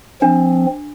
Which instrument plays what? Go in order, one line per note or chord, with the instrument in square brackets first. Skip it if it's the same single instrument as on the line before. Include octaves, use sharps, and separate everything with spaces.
[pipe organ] F3 C4 [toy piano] D4